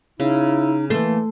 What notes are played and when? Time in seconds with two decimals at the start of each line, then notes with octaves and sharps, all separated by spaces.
0.20 C#3 D#4 E4
0.90 E3 A3 A#3 C6